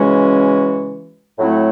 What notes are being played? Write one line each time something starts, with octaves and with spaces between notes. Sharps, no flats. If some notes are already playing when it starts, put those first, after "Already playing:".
Already playing: C#3 E3 G#3 C#4 F#4
A2 F#3 A3 C4 E4